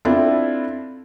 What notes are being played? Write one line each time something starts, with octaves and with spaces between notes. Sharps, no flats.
C4 D4 E4 F4 A4